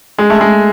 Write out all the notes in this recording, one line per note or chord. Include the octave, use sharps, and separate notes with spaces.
G#3
A3
G#3